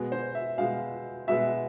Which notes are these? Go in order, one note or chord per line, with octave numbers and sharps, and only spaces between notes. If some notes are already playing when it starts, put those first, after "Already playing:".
Already playing: B2 G#3 B3
C5
E5
B2 G#3 B3 F5
B2 G#3 B3 E5